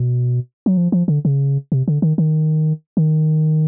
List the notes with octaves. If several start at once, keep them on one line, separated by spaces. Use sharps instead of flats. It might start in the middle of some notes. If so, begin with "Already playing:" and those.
Already playing: B2
F#3
F3
F3
D3
C#3
C3
D3
D#3
D#3
D#3